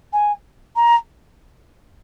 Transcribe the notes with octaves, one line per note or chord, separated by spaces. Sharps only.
G#5
A#5